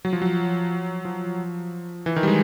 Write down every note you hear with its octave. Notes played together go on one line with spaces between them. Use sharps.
F#3
F3
F#3
F3
E3
D#3
G3
G#3